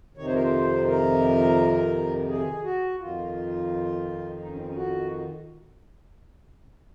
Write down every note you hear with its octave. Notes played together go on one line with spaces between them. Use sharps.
F2 C3 D#3 C#5
C5
A#4
C5
A#4
G#4
F#4
F2 D#3 F4
D#4
C#4
C4
C#4
F#4